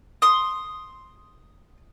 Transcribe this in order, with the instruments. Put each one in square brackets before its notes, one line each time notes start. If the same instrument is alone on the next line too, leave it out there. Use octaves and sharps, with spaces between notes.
[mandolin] C6 D#6